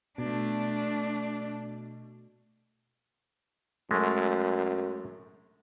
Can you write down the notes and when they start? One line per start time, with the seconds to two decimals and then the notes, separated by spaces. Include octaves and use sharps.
0.18 B2 A3 D4
3.91 F#2 G#3 A3